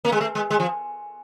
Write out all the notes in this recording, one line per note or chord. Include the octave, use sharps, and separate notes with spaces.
A#3
G#3
A3
G#3
G#3
F3